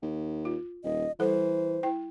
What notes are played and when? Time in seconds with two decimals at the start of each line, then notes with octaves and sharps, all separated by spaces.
0.03 D#2
0.45 F4
0.84 D#1 D#5
1.20 E3 G3 A4 C5 F#5
1.83 E4 G5